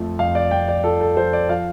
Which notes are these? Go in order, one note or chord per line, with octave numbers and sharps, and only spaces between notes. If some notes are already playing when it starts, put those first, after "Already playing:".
Already playing: F2 F3 A3
F2 F5
D5
F2 G5
D5
F3 A4
A4
F3 C5
D5
F3 F5